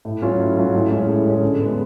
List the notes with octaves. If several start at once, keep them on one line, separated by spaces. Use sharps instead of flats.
A2
F#3 C#4 F4
A2
F#3 C#4 F4
A2
G#3 C#4
A2
G#3 C#4
D3
G#3 B3